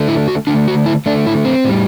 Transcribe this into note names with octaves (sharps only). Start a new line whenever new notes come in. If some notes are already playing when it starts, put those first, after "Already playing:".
Already playing: D3 A3
E4
F#4
D3 A3 D4
F#4
E4
D3 A3 D4
E4
C4
A2 G3